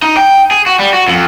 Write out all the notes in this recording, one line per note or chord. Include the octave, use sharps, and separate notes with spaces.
D#4
G5
G#4
F#4
G3
F#4
F2